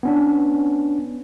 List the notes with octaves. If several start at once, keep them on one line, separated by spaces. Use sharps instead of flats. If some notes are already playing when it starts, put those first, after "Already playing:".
B3 C#4 D4